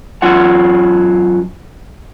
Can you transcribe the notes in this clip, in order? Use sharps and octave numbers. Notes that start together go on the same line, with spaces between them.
F#2 F#3 C#4 F4 F#5